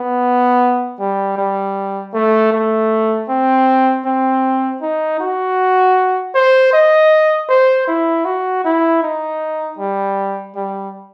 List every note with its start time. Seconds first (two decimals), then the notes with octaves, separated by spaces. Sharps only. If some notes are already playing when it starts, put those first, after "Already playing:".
Already playing: B3
0.99 G3
1.37 G3
2.14 A3
2.52 A3
3.29 C4
4.05 C4
4.81 D#4
5.20 F#4
6.35 C5
6.73 D#5
7.49 C5
7.87 E4
8.25 F#4
8.64 E4
9.02 D#4
9.78 G3
10.55 G3